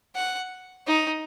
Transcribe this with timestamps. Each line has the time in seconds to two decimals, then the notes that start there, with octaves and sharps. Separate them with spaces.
0.15 F#5
0.87 D#4